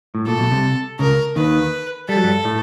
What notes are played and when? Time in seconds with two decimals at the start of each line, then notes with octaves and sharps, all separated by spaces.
0.15 A2
0.26 A#2 A4
0.39 B1 B2
0.51 C2 C3
0.99 C#2 C#3 A#4
1.36 D#2 D#3 B4
2.08 G3 A4
2.17 F#3
2.24 G2 G3
2.45 A2 A3